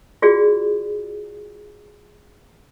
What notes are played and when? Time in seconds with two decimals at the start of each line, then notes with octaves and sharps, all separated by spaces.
0.22 F4 F#4 G#4 D5